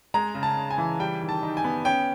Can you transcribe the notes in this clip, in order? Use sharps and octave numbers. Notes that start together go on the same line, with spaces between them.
G#3 A#5
C#3
A5
C#3
G#5
E3
G3 G5
D#3
A5
D#4
G#5
B3
C#4 G5